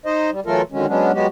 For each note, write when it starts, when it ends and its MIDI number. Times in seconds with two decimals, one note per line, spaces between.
0.06 0.30 63
0.06 0.30 72
0.06 0.30 75
0.31 0.40 55
0.46 0.62 52
0.46 0.62 54
0.46 0.62 57
0.46 0.62 65
0.46 0.62 69
0.46 0.62 70
0.72 0.86 50
0.72 0.86 51
0.72 0.86 54
0.72 0.86 56
0.72 0.86 61
0.88 1.12 54
0.88 1.12 56
0.88 1.12 59
0.88 1.12 61
0.88 1.12 62
1.13 1.27 54
1.13 1.27 56
1.13 1.27 59
1.13 1.27 66
1.13 1.27 67